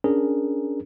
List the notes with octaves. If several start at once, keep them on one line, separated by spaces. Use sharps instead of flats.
C#4 D4 G#4 A#4